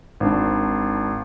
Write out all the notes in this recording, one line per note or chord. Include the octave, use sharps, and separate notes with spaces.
G#1 D4